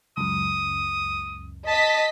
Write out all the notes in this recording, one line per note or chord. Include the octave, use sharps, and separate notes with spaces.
C#2 F#2 D#6
D#5 A5 B6